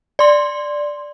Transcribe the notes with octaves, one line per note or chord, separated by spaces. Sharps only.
D5 C6